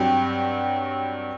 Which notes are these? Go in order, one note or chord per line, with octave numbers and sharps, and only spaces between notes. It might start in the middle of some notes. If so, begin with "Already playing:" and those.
Already playing: G2 F#3 C4 G4